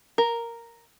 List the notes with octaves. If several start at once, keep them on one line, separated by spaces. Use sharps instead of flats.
A#4